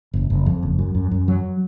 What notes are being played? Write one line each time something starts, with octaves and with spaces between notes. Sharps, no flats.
F#1
F#1
F2
F#1
F#2
F#2
F#2
F#3